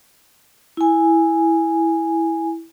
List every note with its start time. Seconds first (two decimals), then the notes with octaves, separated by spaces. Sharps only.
0.77 E4 G#5